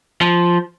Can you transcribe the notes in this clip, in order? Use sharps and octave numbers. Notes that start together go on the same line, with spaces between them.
F3